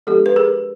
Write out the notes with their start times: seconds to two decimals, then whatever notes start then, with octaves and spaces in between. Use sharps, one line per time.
0.07 F3 G#3 B3 D4 G4 A4
0.26 B4
0.36 G#4 A#4